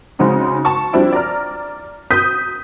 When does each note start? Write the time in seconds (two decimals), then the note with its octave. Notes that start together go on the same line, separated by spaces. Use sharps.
0.19 C#3 G#3 C4 D#4 F#4
0.65 A5 C#6
0.93 F3 G3 C4 D4 E4
1.13 D5 A#5 F6
2.11 D#6 G6 B6